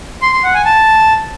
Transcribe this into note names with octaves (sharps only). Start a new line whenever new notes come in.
C6
C6
F#5
G#5
A5